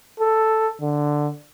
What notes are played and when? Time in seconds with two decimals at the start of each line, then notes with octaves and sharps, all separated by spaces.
0.20 A4
0.81 D3